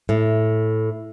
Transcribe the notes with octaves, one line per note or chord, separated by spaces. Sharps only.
A2